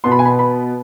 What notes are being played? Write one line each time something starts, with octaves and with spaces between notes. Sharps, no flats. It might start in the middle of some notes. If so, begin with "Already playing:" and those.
B2 B3 C6
B5
G#5
B5
B5